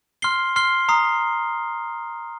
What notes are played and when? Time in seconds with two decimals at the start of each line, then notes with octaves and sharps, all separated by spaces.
0.22 C6 F6 C7 G7
0.56 C6 F6 C7 G7
0.89 A#5 D#6 C7